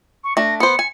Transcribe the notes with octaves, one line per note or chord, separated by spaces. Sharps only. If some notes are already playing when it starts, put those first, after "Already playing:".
C#6
A3 D4 A#6
B3 C5 C#7
G#5